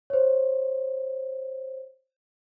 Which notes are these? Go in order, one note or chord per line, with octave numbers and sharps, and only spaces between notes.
C5 C#5